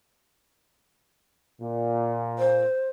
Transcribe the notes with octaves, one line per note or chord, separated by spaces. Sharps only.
A#2
C5